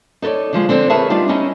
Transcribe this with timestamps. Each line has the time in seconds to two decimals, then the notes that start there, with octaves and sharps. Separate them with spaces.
0.22 D#4 A4 A#4 C#5 D5
0.53 D3 F3 G#3
0.69 D3 C4 C5 D5
0.90 G#4 A#4 B4 C#5 E5 A5
1.10 G3 B3 D4 D#4 F4 G4
1.29 C#4 D#4 E4 D#5